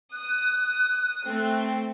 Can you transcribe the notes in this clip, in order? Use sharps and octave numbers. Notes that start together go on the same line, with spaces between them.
D#6 F#6
A3 C4